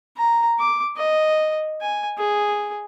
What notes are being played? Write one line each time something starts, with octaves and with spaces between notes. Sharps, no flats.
A#5
D6
D#5
G#5
G#4